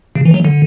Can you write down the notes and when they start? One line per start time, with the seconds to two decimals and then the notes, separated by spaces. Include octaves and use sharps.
0.15 C#3
0.25 E3
0.34 F#3
0.45 D3